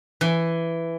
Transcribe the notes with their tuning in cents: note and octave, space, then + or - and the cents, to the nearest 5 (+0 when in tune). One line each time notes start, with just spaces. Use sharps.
E3 +10